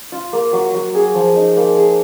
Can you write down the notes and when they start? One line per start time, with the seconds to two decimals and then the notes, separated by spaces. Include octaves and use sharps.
0.12 F4
0.33 A#3
0.53 F#3
0.74 F#3
0.95 G#4
1.14 F3
1.36 D#4
1.57 A#3
1.77 G#4